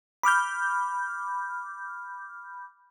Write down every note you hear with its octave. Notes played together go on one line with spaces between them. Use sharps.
B5 D6 F6 G6